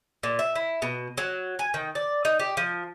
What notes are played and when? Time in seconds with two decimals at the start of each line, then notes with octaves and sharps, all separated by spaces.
0.23 A#2
0.39 E5
0.55 E4
0.82 B2
1.18 F#3
1.59 G#5
1.74 D#3
1.95 D5
2.25 D#4
2.39 G4
2.57 F3